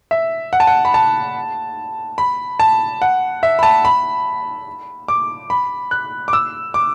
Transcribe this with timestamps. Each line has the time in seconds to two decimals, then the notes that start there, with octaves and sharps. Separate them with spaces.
0.11 E5
0.53 F#5
0.60 A5
0.67 F#5
0.85 B5
0.94 A5
2.18 B5
2.60 A5
3.02 F#5
3.43 E5
3.59 B5
3.63 A5
3.85 B5
5.08 D6
5.50 B5
5.91 F#6
6.28 D6
6.33 E6
6.74 D6